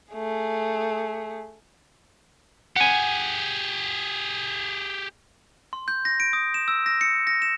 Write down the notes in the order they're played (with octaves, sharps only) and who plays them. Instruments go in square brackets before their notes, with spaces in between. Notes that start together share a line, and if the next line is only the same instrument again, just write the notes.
[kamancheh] A3 G#4
[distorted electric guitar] G4 G#4 [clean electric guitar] F#5 G#5
[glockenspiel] C6
G6
A#6
D7
D#6
E7
E6
A#6
C#7
A#6
E7